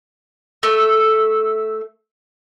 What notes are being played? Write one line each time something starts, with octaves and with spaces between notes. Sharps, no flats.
A3 E5